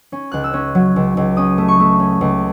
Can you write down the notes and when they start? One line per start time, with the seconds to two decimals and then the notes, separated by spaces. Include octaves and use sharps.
0.12 C#4
0.32 C#2 F#6
0.44 E6
0.53 C#4
0.75 F#3
0.96 C#2
1.17 C#2
1.37 C#4 D#6
1.58 A3
1.68 C#6
1.80 A3
2.00 C#4
2.21 C#2